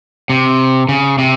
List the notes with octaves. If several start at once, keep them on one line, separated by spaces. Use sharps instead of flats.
C3
C#3
C3